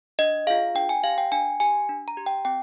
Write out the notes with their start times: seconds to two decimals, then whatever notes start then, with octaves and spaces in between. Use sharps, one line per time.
0.19 D4 D#5
0.47 F4 G#4 F5
0.75 D4 G5
0.89 G#5
1.04 G4 F5
1.18 G5
1.32 D4 G#5
1.60 G4 G#5
1.89 D4
2.08 A#5
2.17 G4
2.26 G5
2.45 C4 G5